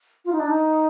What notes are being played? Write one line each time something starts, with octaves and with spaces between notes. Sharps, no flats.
F4
D#4
D4
D#4